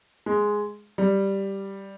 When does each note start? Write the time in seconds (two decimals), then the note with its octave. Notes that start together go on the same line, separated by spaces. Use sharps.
0.26 G#3
0.98 G3